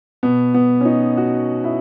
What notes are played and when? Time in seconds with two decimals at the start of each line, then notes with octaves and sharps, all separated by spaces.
0.23 B2 B3
0.54 B3
0.81 C#4
0.85 D#4
1.17 F#4
1.64 E4